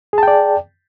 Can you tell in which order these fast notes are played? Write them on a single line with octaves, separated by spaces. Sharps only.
G#4 A5 G5 D5